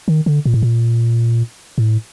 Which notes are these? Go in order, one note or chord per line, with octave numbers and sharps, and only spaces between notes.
D#3
D3
A#2
A2
A#2
A2